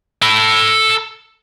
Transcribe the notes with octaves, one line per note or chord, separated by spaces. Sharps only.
A4 B5